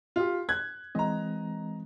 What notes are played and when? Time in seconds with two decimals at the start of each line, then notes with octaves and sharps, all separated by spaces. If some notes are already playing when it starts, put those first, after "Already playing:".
0.16 F4 G4
0.49 F#6 G#6
0.95 E3 G#3 C4 D#5 A#5